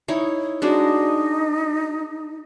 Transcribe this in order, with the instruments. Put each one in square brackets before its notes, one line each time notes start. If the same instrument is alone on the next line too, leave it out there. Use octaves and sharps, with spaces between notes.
[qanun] D#4 E4 C#5
[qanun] G#3 D4 F#4 [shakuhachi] D#4